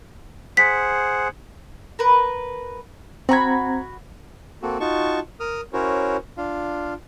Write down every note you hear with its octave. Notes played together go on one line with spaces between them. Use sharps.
G#4 C5 F#5 B6
A#4 B4
C4 F#4 A#5 B5 G#6
A#3 C4 F#4 A4
D#4 F4 F#4 A5 C#6
A#4 D#6 F6
C#4 E4 F#4 A#4 C5 C#5
D4 F4 F5